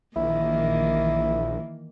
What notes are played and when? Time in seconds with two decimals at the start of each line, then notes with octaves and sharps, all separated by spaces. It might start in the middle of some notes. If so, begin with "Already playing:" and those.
0.16 A#1 D#3 E3 A#3 E4